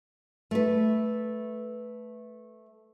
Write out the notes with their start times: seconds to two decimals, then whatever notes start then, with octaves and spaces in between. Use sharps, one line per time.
0.51 A3 B4